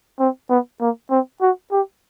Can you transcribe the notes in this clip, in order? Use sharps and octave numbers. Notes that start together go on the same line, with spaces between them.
C4
B3
A#3
C4
F#4
G4